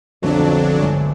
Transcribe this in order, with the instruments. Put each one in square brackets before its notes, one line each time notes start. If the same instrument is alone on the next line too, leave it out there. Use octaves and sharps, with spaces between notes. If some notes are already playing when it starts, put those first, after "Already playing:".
[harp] B1 D3 A3 [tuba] F2 [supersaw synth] F#3 D4
[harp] G1 D2 G#3